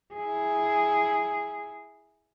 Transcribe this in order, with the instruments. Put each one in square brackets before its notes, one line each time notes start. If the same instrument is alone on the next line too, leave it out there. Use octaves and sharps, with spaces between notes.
[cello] E4 G#4